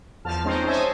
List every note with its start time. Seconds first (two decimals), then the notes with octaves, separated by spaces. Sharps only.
0.25 E2 F3 A5 F6
0.44 G#3 C4 C#4 D#4 C5
0.67 C5 C#5 D#5 E5 G#5 A5